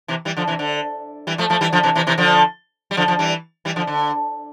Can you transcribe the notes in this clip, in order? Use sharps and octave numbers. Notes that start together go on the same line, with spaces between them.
C3 E3
E3 G3
D3 F3
C3 E3
D3
E3 G3
F3 A3
F3 A3
E3 G3
D3 F3
C3 E3
C3 E3
C3 E3
D3 F3
G3
D3 F3
D3 F3
E3 G3
E3 G3
D3 F3
D3